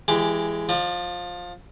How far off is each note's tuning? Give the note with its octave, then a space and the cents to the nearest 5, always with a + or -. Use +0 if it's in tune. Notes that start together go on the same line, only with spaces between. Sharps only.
E3 +25 G#3 +0 G4 +10
F3 +20 D#5 -45